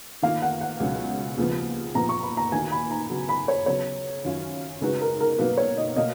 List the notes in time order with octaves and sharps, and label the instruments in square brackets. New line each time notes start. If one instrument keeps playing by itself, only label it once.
[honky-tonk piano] D#3 A#3 F4 [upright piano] F5
[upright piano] F#5
F#5
[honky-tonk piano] C#2 B2 F#3 C#4
D#2 C#3 F3 B3
[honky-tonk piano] A#2 F3 B3 [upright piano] A#5
[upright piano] C#6
B5
A#5
[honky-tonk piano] D#2 D#3 A#3 D#4 F#4 [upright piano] G#5
[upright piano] B5
A#5
[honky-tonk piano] C#3 F#3 B3 F#4
[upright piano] B5
C#5
[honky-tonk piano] C#3 F#3 B3 [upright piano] C#5
[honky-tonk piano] F#2 D#3 F#3 C#4 F4
[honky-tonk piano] C#3 G#3 D#4 F#4 [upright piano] B4
[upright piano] A#4
A#4
A#4
[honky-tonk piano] B2 F#3 A#3 D#4 [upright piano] B4
[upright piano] C#5
D#5
[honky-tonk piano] B2 A#3 [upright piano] D#5